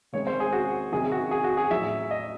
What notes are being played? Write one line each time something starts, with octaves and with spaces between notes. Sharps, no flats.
C3 D#3 G#3 C#5
C5
G#4
F#4
C3 D#3 F#3 G#4
F#4
G#4
F#4
G#4
A2 F#3 E5
D#5